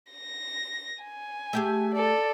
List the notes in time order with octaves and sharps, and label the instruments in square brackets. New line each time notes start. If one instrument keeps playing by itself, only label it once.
[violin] A#6
G#5
[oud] A3 G4 G#4
[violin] A4 D5